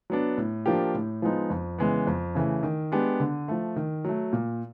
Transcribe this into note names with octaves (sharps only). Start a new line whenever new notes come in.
F#3 B3 D4
A2
F3 A#3 D4 G4
A2
F3 G#3 B3 D#4
F2
C#3 E3 G#3 B3
F2
C#3 E3 A3
D#3
G#3 B3 D4 G4
D3
F3 A3
D#3
F#3 A3
A#2